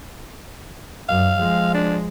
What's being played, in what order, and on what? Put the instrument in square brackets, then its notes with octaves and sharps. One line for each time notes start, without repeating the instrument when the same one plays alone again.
[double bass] F#2 [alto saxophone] F5
[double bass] F3 G#3
[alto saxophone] D4